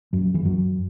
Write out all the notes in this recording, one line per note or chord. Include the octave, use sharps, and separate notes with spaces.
F#2 F#3
E3
F#2 F#3